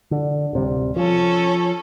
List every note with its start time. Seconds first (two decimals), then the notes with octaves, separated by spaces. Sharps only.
0.11 D3
0.53 D1 C3 G3
0.96 F3 C#4 A4